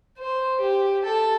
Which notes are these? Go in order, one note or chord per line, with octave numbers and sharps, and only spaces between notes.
C5
G4
A4